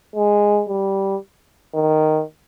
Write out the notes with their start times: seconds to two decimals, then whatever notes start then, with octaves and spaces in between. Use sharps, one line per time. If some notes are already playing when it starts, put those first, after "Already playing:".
0.16 G#3
0.69 G3
1.75 D#3